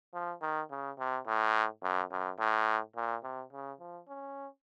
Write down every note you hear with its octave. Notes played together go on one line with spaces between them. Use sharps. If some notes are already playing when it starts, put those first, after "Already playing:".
F3
D#3
C#3
C3
A2
F#2
F#2
A2
A#2
C3
C#3
F3
C#4